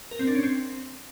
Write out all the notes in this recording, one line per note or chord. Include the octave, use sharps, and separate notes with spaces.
A#4
C4
D4
C#4
C4